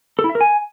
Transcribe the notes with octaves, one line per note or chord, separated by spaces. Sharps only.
A4
E4
E5
A#4
G#5